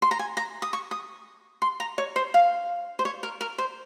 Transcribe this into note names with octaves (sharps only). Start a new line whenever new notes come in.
C6
A#5
G#5
A#5
D#6
C#6
D#6
C6
A#5
C#5
C5
F5
C5
C#5
A#4
A#4
C5